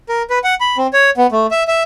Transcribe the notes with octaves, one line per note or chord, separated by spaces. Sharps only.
A#4
B4
F#5
B5
C4
C#5
B3
A3
E5
E5